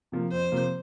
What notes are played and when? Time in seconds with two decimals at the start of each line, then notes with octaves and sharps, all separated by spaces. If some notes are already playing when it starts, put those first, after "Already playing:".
0.12 C3 F3 A#3
0.32 F2 C5
0.52 C3 F3 A#3